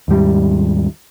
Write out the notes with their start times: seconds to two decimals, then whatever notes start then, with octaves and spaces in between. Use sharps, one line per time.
0.08 D#2 G#2 G3